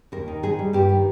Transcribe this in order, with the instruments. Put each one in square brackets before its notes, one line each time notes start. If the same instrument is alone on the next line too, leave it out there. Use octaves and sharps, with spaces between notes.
[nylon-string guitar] D#2 A#4
D#3
G#2 G#4
G3
G2 G4
D#3